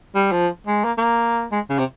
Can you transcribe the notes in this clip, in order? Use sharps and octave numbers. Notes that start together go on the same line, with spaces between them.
G3
F3
G#3
A#3
A#3
G#3
C#3
C3